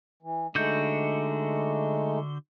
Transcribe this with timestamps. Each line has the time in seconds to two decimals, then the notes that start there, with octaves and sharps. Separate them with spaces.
0.23 E3
0.55 D3 G#3 A3 D#4 F#4 G6